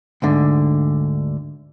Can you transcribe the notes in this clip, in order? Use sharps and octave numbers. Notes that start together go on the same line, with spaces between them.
D2 G#2 D3